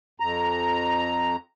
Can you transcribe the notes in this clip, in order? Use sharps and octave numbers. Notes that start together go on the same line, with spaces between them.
F2 A#5